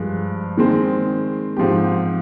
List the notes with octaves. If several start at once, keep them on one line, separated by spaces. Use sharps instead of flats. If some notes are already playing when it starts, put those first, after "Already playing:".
Already playing: G2 F3 G#3
D#3 G#3 C4
G#2 F3 C4 G4